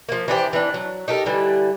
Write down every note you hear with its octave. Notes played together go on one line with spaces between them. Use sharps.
F3 A#3
E3 D4 G4 C5
E3 D4
F#3
D#4 G4 A4 A#4
D3 E3 G3